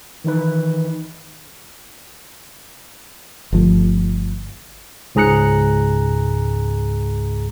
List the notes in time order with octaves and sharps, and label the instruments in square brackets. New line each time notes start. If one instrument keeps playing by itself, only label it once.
[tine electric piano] D#3 E3 D#4 B4
[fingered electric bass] G1 F3 A3
[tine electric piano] C#2 G#2 G#4 A#5 F#6 C#7